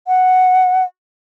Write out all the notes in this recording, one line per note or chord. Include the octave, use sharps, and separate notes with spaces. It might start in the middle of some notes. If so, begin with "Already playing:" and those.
F#5